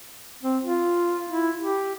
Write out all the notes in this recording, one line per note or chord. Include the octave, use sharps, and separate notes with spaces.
C4
F4
E4
G4